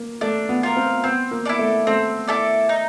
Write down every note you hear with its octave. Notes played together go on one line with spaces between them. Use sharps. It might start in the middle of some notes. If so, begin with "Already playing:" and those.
Already playing: A#3
A3 D4
B3
F4 A#4
C4
B3 C4
A#3
E4 A4 D5
A3
A3 C4
E4 A4 D5
D#4